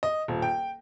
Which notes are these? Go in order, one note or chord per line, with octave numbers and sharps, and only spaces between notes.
D#5
D#1
G5